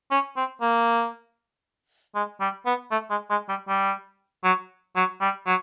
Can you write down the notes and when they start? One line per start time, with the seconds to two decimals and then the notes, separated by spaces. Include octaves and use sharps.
0.11 C#4
0.36 C4
0.61 A#3
2.15 G#3
2.40 G3
2.66 B3
2.91 A3
3.10 G#3
3.30 G#3
3.49 G3
3.68 G3
4.44 F#3
4.96 F#3
5.21 G3
5.47 F#3